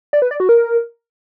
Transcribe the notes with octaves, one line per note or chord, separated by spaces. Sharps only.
D5
B4
D5
F#4
A#4